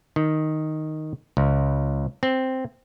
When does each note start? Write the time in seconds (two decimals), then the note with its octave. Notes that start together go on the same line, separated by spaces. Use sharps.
0.16 D#3
1.37 C#2
2.23 C4